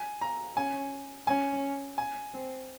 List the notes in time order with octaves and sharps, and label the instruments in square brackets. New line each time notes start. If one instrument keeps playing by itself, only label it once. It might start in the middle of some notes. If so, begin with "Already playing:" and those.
Already playing: [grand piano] G#5
A#5
[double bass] C#4 [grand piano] G#5
[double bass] C#4 [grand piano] G#5
[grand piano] G#5
[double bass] C4